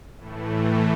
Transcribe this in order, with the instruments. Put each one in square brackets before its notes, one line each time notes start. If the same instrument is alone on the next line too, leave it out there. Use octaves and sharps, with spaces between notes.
[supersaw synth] A2 E3 A3